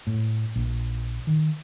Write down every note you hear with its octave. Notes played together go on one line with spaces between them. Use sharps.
A2
A#1
D#3